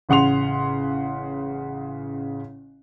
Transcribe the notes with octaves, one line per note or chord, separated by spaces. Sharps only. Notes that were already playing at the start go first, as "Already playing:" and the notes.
A1 C#3 F#5 C6 F7